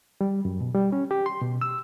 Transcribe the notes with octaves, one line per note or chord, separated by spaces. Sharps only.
G3
F#2
B2
G3
C#4
G4
C6
B2
E6